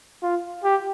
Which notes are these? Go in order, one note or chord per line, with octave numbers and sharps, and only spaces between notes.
F4
G4